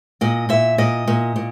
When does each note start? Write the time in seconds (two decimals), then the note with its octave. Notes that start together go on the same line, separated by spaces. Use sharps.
0.21 A#2 D#5
0.49 A#2 E5
0.78 A#2 D#5
1.08 A#2
1.36 A#2